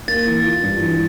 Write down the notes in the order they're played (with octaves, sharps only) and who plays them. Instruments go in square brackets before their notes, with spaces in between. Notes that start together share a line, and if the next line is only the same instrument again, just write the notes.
[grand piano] A#3 [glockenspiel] A6
[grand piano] E3
F4
G2
E3